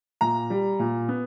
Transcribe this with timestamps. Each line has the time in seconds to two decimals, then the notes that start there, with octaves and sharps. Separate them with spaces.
0.21 A#2 A#5
0.50 G3
0.79 A#2
1.08 B3